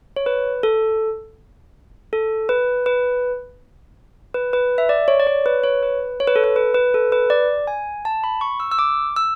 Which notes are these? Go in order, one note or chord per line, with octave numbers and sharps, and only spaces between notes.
C#5
B4
A4
A4
B4
B4
B4
B4
E5
D5
C#5
D5
C#5
B4
C#5
B4
C#5
B4
A4
B4
B4
B4
A4
B4
D5
G#5
A5
B5
C#6
E6
E6
D6
E6